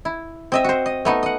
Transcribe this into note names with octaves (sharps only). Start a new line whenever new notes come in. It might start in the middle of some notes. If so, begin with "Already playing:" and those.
E4
C4 D#5 E5
F#4 C5
D#5
A3 B3 D#4
D#5 F#5